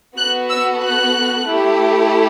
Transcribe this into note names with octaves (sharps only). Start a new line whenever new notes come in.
B3 F#4 A4 F#6
E6
F#6
A3 E4 G4